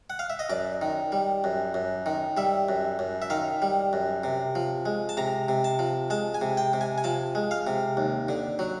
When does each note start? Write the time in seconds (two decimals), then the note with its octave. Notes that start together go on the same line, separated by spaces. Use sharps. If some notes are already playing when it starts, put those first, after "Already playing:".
0.10 F#5
0.19 F5
0.30 E5
0.39 D#5
0.50 F#2 D5
0.82 D#3
1.12 G3
1.44 F#2
1.74 F#2
2.06 D#3
2.37 G3 E5
2.69 F#2
2.99 F#2
3.22 E5
3.30 D#3 F5
3.62 G3
3.93 F#2
4.24 C3
4.55 F3
4.86 G#3
5.09 A5
5.17 C3 A#5
5.49 C3
5.64 A5
5.79 F3
6.10 G#3 A5
6.35 G#5
6.41 C3
6.57 G5
6.73 C3
6.81 G#5
6.98 G#5
7.04 F3 A5
7.35 G#3
7.51 F5
7.67 C3
7.97 D#2
8.29 D3
8.59 F#3